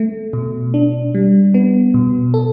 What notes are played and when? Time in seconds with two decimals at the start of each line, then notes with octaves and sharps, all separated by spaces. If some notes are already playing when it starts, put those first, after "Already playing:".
Already playing: A3
0.33 B2
0.74 D4
1.15 G3
1.54 B3
1.94 B2
2.34 A4